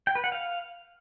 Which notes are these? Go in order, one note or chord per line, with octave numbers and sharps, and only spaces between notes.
G5
B4
F#5
F5